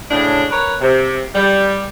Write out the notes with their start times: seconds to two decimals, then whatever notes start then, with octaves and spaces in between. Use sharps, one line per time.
0.10 A2 C#3 D4
0.50 A#4 B4 C#5
0.80 C3
1.34 G3